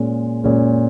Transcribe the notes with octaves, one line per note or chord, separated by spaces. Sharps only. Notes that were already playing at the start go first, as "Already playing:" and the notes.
Already playing: A#2 G#3 C#4
A#2 G#3 C#4